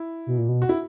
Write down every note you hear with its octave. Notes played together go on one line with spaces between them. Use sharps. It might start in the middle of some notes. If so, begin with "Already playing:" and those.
Already playing: E4
B2
A#2
B2
F#4
E4